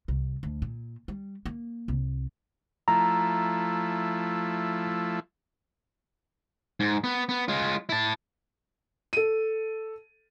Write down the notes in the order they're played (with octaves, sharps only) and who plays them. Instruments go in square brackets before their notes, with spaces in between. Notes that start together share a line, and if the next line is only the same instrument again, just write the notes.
[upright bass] C2
D2
A#2
G3
A#3
C2
[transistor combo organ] F3 A3 E4 [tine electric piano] A#5
[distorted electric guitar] G#2
B3
B3
G#3 F4
E4 A5
[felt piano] A4 D#7